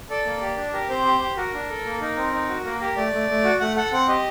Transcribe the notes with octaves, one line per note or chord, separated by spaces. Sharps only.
A4 D5
A#3
G4
D4
G4 A#4
C4 C5
G4
G4
F#4 A#4
D4
A4
A#3
D#4 A#4
C4
D#4
F#4
A#3 A#4
G4 A#4
A3 D5
A3
A3
F#4
A3 F#5
A4 F#5
C4 F#5
G4 D#5